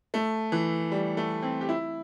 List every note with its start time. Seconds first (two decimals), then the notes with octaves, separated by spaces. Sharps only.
0.14 A3
0.52 E3
0.92 G3
1.17 A3
1.42 C4
1.61 G4
1.69 E4